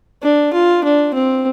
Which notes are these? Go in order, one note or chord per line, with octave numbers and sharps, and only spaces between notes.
D4
F4
D4
C4